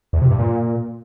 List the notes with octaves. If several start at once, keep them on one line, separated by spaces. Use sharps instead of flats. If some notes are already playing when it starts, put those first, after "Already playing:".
E2
C3
G2
A#2